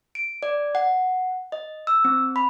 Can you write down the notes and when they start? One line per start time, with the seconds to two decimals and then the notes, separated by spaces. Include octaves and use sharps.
0.15 D7
0.43 D5
0.75 F#5
1.52 D#5
1.87 E6
2.05 C4
2.36 B5